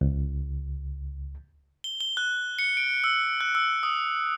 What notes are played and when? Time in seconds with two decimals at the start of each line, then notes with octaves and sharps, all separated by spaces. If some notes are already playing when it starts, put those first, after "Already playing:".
0.01 C#2
1.84 G7
2.01 G7
2.17 F#6
2.59 C#7
2.77 D7
3.04 E6
3.41 F#6
3.55 E6
3.83 D#6